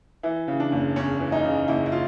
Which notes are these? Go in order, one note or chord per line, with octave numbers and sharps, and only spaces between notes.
E3 E4
C#3
D4
F#1
E2 C#4
E3
D#4
C#3
F#1 E4
E4
F4